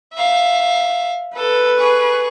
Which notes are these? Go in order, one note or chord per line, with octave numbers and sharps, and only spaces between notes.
E5 F5
A4 B4
G#4 C#6